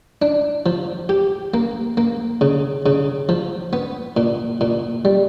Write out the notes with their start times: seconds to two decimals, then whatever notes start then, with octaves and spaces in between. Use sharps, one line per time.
0.22 D4
0.66 F3
1.09 G4
1.54 A#3
1.97 A#3
2.41 C#3
2.86 C#3
3.29 F3
3.73 B3
4.17 A#2
4.61 A#2
5.05 G3